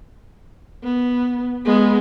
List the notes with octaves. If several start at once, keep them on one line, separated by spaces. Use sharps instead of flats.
B3
G#3 B3